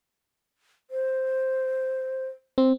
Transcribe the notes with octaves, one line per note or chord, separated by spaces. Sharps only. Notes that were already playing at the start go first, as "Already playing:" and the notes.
C5
C4